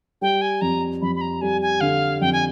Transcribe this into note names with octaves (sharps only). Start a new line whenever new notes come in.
G3 G5
G#5
F2 A#5
F2 B5
B5
A#5
G3 G#5
G#5
D3 F5
F2 G5
G#5